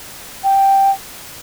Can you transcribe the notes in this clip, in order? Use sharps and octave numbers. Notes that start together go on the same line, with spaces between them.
G5